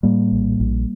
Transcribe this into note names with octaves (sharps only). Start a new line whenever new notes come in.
A2 G3 A#3
A#1
A#1